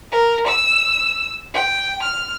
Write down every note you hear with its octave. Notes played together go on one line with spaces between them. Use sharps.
A#4
E6
G5
F6